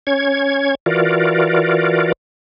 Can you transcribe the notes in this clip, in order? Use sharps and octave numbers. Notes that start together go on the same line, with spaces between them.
C#4 C#5 G#6
E3 F4 F#4 A#4 D5